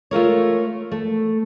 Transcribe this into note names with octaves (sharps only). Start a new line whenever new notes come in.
A3 F4 A#4 C#5
A3